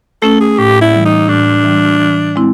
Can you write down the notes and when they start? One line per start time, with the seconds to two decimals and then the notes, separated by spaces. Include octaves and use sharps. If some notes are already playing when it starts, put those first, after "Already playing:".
0.22 A3 C#4 A4
0.40 G#4
0.58 A2 G4
0.81 E4
0.94 E3 G3
1.05 D#4
1.29 A2 D4
1.64 E3 G3
2.00 E3
2.36 G#3 C4 E4